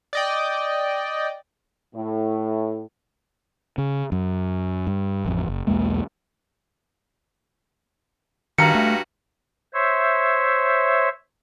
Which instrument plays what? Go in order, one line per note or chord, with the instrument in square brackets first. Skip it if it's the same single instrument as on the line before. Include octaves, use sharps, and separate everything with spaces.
[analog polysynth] D5 D#5 G5
[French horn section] A2
[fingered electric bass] C#3
F#2
G2
A1 F2
F#1
B1 E2 G#3 A#3
[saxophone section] G2 F#4 F5 [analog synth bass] D#3 [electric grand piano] A#5 C#7
[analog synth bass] A3
[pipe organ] C5 C#5 E5